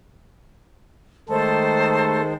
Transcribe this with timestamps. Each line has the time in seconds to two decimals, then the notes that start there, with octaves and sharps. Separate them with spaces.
1.29 D#3 G#3 A3 A4 C5 A5